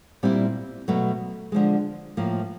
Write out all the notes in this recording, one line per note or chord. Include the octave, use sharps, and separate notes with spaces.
A#2 G3 C4 E4
B2 F#3 A3
D3 F3 G#3
A2 F3 A#3